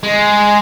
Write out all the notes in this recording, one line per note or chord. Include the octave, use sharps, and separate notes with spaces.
G#3